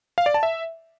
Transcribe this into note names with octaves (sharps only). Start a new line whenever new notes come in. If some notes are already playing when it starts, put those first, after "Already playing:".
F5
D5
A5
E5